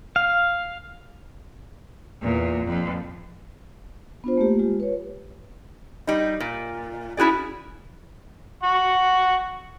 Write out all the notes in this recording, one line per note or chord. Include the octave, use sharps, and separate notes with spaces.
F5
E2 A#2
F2
B3 D4 F4 C5
A3 A#3 G4
G#3 F4 G4
B4 C#5
G3 D#4
A#2
C#4 E4 F#4 G#4 D5
F#5 C#6